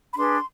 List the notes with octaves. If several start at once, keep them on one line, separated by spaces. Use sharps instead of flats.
B5
D4 G#4 B4 C6